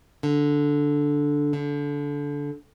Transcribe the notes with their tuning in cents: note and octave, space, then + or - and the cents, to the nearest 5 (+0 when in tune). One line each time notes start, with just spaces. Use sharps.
D3 -5
D3 -20